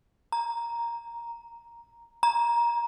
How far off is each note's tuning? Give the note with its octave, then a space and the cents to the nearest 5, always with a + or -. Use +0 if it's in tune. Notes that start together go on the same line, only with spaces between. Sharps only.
A#5 +5
A#5 +20